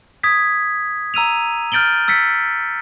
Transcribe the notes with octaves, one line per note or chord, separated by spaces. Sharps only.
D#6 G#6 B6
A#5 E6 D#7 F7
F6 G6 A6 D7 F#7 G7
E6 A6 B6 C#7